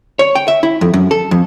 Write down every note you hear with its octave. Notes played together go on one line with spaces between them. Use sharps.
C#5
G5
E5
E4
F2
F#2
A4
F2